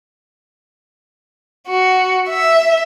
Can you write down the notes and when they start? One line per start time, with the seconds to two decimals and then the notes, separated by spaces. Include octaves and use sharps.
1.69 F#4
2.30 E5